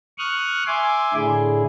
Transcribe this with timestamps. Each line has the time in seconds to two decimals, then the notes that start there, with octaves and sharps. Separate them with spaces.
0.18 C#6 D#6 F6 F#6
0.67 E5 G#5 C6 D6
1.14 A2 D3 E4 G#4